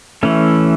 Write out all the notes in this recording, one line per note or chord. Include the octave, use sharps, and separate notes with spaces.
E3 A3 C#4